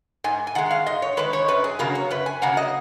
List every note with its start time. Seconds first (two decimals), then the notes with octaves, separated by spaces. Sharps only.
0.24 G#2 G#5
0.47 G#5
0.55 D#3 G#3 F#5
0.71 F5
0.86 G#2 D#5
1.02 C#5
1.17 D#3 G#3 B4
1.33 C#5
1.48 F#2 B4
1.64 G#4
1.79 C#3 F#3 A#3 A#4
1.95 C#5
2.11 F#2 B4
2.26 G#5
2.42 C#3 F#3 A#3 F#5
2.57 D#5